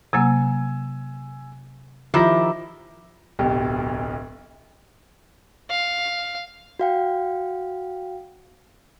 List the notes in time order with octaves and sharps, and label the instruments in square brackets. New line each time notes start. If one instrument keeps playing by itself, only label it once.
[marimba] C3 F#3 A#3 [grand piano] G#5 E6 G#6
[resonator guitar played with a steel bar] D#3 E4 G4 [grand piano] F3 A#5 A#6
[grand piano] D1 B1 G4
[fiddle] F5
[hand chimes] F#4 F5 G5